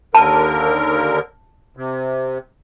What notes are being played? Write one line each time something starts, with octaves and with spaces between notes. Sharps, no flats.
D#2 D3 A#4 A5
C3